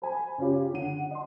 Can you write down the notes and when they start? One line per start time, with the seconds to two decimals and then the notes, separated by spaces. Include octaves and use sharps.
0.02 C5 G#5 B5
0.38 C#3 C#4 F4 G4
0.73 D3 F#5 D#7
1.11 D#5 C6